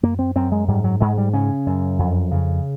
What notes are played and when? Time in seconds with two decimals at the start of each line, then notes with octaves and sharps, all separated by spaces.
0.03 F#2 A#3
0.19 C4
0.35 F#2 C4
0.52 G#3
0.68 G#2 G3
0.84 F#3
1.01 G#2 G#3
1.18 G3
1.33 C#3 C#4
1.66 F#2
1.99 F2
2.32 C#3